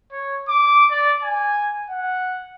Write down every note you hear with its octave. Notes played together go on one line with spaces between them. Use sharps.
C#5
D6
D5
G#5
F#5